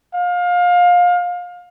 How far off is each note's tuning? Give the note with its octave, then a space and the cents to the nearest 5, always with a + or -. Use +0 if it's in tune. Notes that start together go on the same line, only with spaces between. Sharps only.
F5 +25